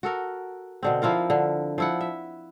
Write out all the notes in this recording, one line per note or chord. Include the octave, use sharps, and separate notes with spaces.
F#4 A4 A#4
B2 D3 C4
F3 E4 F4 A#4
D3
F3 E4 F#5
E5